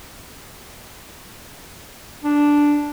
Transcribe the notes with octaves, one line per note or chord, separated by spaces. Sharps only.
D4